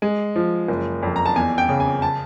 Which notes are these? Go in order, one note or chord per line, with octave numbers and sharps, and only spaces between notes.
G#3
F3
F#1
F2
A#5
A5
E2 G#5
G5
C#3
G#5
A5